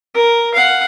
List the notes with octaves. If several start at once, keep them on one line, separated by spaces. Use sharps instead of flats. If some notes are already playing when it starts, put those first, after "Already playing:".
A#4
F5 F#5